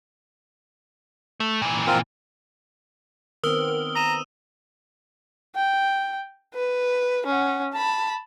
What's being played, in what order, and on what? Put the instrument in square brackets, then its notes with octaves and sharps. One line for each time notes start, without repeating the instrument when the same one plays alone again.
[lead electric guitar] A3
A#2 E3
[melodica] C4 F4 A#4
[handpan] D#3 B3 C4 [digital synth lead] A#4 [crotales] D#6 E6 G7
[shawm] A#5 [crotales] D#6 D#7 E7
[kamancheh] G5
B4
C#4 F#5
A5 B5